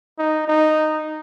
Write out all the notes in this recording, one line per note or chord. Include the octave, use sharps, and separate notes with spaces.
D#4
D#4